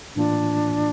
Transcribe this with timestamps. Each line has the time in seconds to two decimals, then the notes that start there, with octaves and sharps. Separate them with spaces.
0.16 A2 E3 A#3 D4 F4